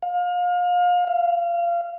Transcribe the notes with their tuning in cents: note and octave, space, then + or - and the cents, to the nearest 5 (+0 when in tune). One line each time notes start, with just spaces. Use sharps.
F5 +30
F5 -25